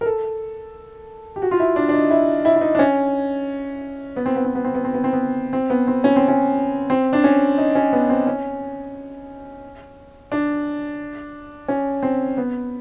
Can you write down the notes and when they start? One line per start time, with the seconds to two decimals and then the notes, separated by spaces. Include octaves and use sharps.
0.01 A#4
0.06 A4
1.36 G4
1.42 F#4
1.51 F4
1.59 E4
1.76 D4
1.89 D4
1.94 D#4
2.11 E4
2.45 E4
2.56 E4
2.61 D#4
2.75 D4
2.79 C#4
4.16 B3
4.26 C4
4.36 B3
4.45 C4
4.55 B3
4.65 C4
4.74 B3
4.84 C4
4.94 B3
5.04 C4
5.13 B3
5.53 C4
5.70 B3
5.87 C4
6.04 C#4
6.16 C4
6.28 C#4
6.90 C4
7.13 D4
7.24 C#4
7.58 D#4
7.75 C#4
7.93 B3
8.10 C4
8.27 C#4
10.32 D4
11.68 C#4
12.03 C4
12.37 B3